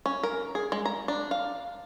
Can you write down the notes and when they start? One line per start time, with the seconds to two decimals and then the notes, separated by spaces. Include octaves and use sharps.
0.06 C#4
0.23 A#4
0.55 G#4
0.72 G#3
0.85 A#5
1.08 D4
1.31 F5